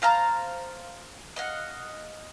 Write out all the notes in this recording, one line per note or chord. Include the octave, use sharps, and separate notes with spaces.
C5 F5 A5 A#5
D#5 F5 F#5